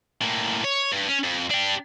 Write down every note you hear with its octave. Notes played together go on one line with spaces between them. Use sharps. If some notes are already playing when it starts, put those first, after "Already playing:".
A2 A#3
C#5
G2
C#4
F2
D4 G4